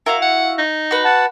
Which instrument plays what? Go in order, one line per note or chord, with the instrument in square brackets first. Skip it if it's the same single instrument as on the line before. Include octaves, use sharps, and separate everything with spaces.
[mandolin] E4 F#4 F5 [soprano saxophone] A#4
[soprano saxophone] F#5
D#4
[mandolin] F#4 B4
[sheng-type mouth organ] F#5 A5